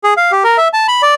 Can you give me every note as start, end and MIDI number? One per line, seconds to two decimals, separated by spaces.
0.04 0.14 68
0.17 0.32 77
0.32 0.44 67
0.44 0.57 70
0.58 0.68 76
0.73 0.87 81
0.88 1.02 83
1.02 1.15 74